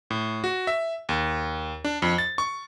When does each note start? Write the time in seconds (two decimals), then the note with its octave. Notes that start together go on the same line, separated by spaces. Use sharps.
0.10 A2
0.44 F#4
0.67 E5
1.09 D#2
1.84 D4
2.02 F2
2.18 A6
2.38 C#6